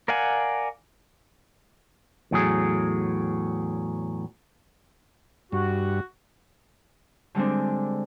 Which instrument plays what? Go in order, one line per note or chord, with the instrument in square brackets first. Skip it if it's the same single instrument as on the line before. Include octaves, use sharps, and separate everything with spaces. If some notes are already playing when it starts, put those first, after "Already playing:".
[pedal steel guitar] A#4 D5 F5 F#5 G#5
[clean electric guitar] E2 A2 F#3 G#4
[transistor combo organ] G2 [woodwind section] F#4
[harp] D3 G3 G#3 C4 D4